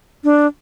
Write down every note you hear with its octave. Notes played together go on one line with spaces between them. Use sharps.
D4